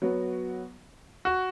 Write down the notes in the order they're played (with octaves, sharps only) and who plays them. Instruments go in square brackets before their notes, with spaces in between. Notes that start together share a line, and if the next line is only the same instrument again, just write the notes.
[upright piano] F#3 B3 F#4
[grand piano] F#4